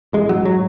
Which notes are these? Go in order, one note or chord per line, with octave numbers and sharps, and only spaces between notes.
A1 G#3
F#3
G#2
F#3